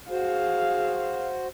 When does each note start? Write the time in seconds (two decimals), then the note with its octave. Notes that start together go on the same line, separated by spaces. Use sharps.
0.10 F#4 G#4 C5 F5